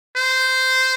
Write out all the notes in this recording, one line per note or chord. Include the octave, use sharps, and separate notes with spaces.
C5